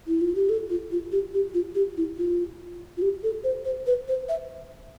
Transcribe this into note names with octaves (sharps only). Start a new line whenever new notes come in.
E4
F4
G4
A4
F4
F4
G4
G4
F4
G4
E4
F4
F4
G4
A4
C5
C5
B4
C5
E5